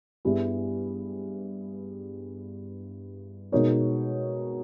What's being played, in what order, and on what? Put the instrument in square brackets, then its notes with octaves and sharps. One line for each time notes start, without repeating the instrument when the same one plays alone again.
[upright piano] G2 G3 B3 E4 G#4
B2 G#3 D#4 A#4 C#5